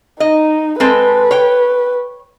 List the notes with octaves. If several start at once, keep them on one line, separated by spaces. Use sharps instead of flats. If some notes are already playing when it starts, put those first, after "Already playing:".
D#4 D#5
G#3 C4 A4 B4
C#5 G5